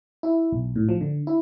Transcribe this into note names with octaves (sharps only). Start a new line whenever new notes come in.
E4
B1
A2
F3
D3
E4